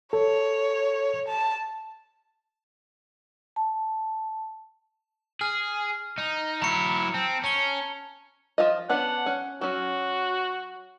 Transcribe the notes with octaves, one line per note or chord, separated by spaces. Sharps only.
A4 C#5
A5
A5
G#4 F6
D#4
F#3 E4 A#5 C#7
C4 A5
C#4 A5 F7 G7
F3 F4 D#5
B3 C#4 D4 F#5
C#4
F#3 C#4 F#4